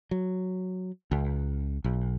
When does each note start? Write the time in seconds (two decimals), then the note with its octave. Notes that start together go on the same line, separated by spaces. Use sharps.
0.11 F#3
1.11 C#2
1.84 B1